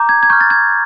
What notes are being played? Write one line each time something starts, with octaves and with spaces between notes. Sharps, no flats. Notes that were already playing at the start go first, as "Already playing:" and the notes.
Already playing: A#5 D6 G6
G#6
G#6
C#6 F6 G6
A6
G#6